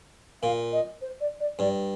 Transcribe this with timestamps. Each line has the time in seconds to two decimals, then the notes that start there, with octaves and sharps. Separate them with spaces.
0.43 A#2 F5
0.72 D#5
1.01 C5
1.20 D5
1.40 D5
1.59 G2 D5